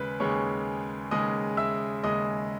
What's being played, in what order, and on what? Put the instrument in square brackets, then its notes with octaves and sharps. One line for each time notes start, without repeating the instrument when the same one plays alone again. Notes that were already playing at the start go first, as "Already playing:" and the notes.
Already playing: [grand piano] D#2 C#3 G#3 B4 B5
D#2 C#3 G#3 C#5 C#6
D#2 C#3 G#3 D#5 D#6
E5 E6
D#2 C#3 G#3 D#5 D#6